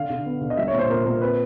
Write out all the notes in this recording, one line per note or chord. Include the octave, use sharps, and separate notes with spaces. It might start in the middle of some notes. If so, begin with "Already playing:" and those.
Already playing: D3 F5
D3
B3
D3
D#5
G3 E5
C#5
A#2
C5
A#2 A#4
A#2 A#4
C4 B4